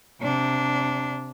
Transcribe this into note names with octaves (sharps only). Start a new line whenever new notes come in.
C3 D4